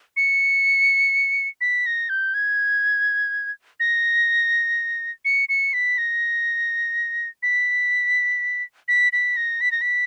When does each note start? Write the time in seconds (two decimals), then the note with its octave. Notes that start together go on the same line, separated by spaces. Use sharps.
0.17 C#7
1.61 B6
1.86 A#6
2.09 G6
2.34 G#6
3.80 A#6
5.25 C#7
5.49 C#7
5.73 B6
5.98 A#6
7.43 B6
8.88 B6
9.13 B6
9.37 A#6
9.61 B6
9.72 A#6
9.82 B6